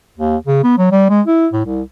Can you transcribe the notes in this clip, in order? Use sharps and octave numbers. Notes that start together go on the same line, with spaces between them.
D#2
C#3
B3
F#3
G3
G#3
E4
A2
C2